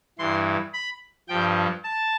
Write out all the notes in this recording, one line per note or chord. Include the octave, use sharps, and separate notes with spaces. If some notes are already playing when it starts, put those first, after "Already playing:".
G2 E3 C6
B5
G2 F3 G5
A5